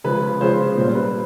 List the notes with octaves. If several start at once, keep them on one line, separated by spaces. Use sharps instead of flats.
C#3 F3 G#3 B4
C#3 F3 G#3 C5
A#2 G3 C5
B4